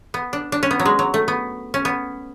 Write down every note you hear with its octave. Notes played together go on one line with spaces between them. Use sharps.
B3
D4
D4
C#4
B3
F#3
G#3
F#3
A3
B3
C#4
B3